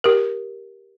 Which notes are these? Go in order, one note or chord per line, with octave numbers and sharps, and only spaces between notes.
G4 A#4